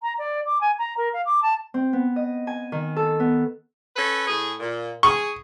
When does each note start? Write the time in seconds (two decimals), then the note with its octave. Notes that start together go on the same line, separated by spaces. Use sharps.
0.02 A#5
0.18 D5
0.45 D6
0.60 G#5
0.78 A#5
0.97 A#4
1.13 F5
1.25 D6
1.42 A5
1.74 C4
1.93 B3
2.16 D#5
2.47 G#5
2.72 D#3
2.96 A4
3.20 B3
3.96 C#4 A4 B4
4.26 A2 G#4
4.60 A#2
5.03 G#4 C#6